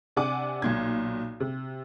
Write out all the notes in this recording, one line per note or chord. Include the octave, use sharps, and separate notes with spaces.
C3 D4 F#5 G#5 D6
B1 A#2 G#6
C3